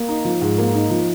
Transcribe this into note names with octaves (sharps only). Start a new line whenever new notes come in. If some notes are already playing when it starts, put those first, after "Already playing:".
Already playing: A#3
D#4
F3
G#2
A#3
D#4
F3